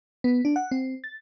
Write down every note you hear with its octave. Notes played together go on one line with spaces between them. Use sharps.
B3
D4
F#5
C4
A6